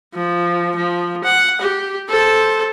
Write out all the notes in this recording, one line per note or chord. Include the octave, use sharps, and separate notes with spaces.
F3
F3
F#5
G4
A4 C5